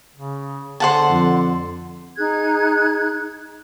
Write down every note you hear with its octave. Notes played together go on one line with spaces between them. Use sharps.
C#3
D3 C5 F#5 A5
F2
D#4 G#4 F#6 G#6